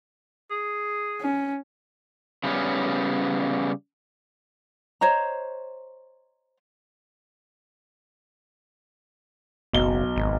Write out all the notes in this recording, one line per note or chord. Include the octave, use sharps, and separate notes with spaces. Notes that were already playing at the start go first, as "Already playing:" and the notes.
G#4
C#4
C#3 G3 B3 C#4
C5 C#5 D#5 A#5
F#1 B1 G7
G#1